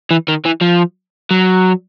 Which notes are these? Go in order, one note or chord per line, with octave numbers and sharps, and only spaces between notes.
E3
D#3
E3
F3
F#3